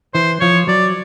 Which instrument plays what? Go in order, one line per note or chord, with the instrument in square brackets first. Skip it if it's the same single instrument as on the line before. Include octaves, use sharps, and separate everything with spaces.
[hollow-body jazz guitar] E3 [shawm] C5
[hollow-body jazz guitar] F3 [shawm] C#5
[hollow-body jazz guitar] F#3 [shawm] D5